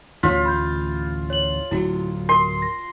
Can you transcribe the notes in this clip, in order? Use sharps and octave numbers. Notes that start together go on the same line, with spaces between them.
A1 D2 F4 C#5 B6
B5 G6
C#5 F#7
D1 F#3 E4 F#4
A#4 C6
A#6